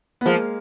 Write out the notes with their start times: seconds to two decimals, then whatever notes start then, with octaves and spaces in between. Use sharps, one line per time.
0.21 B3
0.26 F3 G#3 A#3